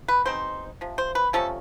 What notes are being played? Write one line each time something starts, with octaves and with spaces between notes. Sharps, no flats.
B4
B2 G#3 C4 D#4 C5
C3 F3
C5
B4
C3 F3 A3 C#4 A4